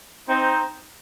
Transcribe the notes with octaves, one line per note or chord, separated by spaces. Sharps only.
C4 D#4